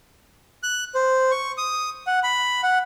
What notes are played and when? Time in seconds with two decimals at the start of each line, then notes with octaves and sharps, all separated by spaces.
0.63 F#6
0.95 C5
1.31 C#6
1.58 D#6
2.07 F#5
2.23 B5
2.63 F#5